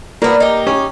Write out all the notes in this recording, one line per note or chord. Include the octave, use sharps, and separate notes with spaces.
A#3 B3 D4
D#4 G4
C#4